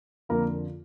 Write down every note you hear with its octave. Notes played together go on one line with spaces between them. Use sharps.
F2 D3 F3 A#3 A#4